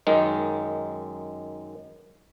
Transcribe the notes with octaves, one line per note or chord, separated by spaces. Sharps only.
F#2 D#3 G#3 D#4